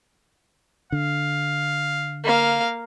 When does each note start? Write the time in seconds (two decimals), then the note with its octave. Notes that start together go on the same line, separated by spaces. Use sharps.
0.92 D3 F5
2.24 A#3 F5